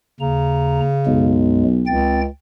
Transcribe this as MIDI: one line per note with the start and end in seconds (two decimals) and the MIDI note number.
0.20 0.80 39
0.20 1.47 49
0.20 0.80 82
1.07 2.00 35
1.07 1.64 42
1.07 1.64 54
1.07 1.64 56
1.87 2.27 37
1.87 2.21 60
1.87 2.21 79
1.87 2.21 93